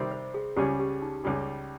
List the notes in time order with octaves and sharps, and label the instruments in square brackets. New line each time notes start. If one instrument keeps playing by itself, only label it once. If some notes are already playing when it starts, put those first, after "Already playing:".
Already playing: [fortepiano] C3 D#3 G3 C4
[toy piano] C5
G#4
[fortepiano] C#2 C#3 G3 C#4 G#4 [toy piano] G4
[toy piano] G4
D#4
[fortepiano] C#2 C#3 G3 C#4 G#4